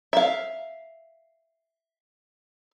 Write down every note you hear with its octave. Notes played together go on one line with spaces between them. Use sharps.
E5 F5